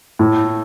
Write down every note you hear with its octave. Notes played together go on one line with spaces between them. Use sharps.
A2